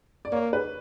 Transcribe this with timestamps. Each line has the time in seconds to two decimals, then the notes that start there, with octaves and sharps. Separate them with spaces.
0.25 D5
0.32 A#3 C#5
0.53 B4